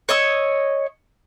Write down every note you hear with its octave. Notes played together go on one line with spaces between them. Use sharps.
C#5 D#5 E6